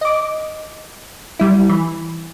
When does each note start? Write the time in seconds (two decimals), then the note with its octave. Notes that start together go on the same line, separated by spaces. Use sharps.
0.01 D#5 D6
1.39 G3 E4
1.69 E3